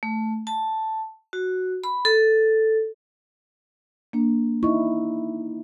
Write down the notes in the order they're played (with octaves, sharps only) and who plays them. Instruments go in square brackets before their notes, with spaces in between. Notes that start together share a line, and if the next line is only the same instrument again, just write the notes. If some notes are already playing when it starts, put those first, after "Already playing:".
[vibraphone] A3
A5
F#4
B5
A4
[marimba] A#3 D4
[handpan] D#4 E4 [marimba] C#6